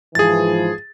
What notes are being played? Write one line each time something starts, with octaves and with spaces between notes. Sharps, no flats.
G#2 E3 F3 G#4 A6